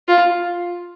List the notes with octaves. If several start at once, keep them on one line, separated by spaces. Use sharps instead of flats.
F4